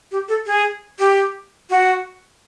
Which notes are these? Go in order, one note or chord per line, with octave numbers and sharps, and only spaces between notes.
G4
A4
G#4
G4
F#4